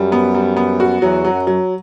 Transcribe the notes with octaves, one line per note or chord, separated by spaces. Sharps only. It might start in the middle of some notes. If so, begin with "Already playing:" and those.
Already playing: F#2 G3
B3
G3
B3
F#4
E2 F#3
F#3
F#2
F#3